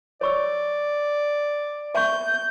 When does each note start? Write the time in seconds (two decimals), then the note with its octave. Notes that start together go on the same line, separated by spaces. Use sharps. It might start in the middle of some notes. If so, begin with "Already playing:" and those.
0.21 C#5 D5 C#6 E6
1.95 E5 C#6 G6